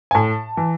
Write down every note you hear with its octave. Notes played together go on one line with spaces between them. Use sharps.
G#5
A2 A5
E3